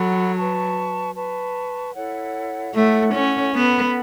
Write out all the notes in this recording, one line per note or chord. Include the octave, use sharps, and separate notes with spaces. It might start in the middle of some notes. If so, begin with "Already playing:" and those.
Already playing: F#3 A4 F#5 B5
B4 A5 C#6
B4 A5 C#6
E4 A4 C#5 F#5
A3 E4 A4 C#5 F#5
C#4
B3 A4 F#5 B5